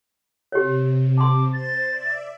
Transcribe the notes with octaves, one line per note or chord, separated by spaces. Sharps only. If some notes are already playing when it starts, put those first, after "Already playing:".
C3 G4 C#5
A5 C6 D6
C5 A6
D5 E5